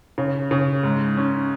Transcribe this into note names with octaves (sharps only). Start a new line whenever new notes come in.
C#3
C#3
G#2
C#4